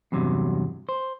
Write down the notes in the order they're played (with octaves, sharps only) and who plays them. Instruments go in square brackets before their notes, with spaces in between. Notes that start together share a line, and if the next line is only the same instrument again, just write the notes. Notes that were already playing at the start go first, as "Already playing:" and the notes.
[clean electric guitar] E2 G2 C3 F#3
C5